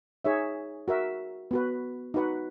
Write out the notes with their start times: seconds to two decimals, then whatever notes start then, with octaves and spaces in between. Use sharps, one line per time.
0.25 D#4 G#4 C#5 E5
0.88 F#4 A#4 E5
1.51 B3 F#4 B4
2.14 D#4 F#4 B4 F#5